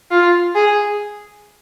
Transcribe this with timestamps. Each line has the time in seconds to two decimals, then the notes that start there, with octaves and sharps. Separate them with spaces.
0.11 F4
0.55 G#4